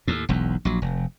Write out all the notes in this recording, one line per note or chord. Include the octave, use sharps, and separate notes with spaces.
D#2 A2
E1 B1 E2
A#1 F#3
F1